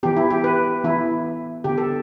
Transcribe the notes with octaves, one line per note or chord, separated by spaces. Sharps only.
E3 B3 G4
E4
G4
B4
E3 B3 E4
D3 B3 G4
A4